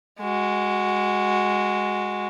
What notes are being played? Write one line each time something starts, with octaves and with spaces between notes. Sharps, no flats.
G#3 F#4